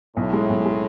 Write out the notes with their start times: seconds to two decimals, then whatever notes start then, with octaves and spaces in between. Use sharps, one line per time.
0.17 B1 A2
0.33 G#3
0.50 B1
0.66 G#3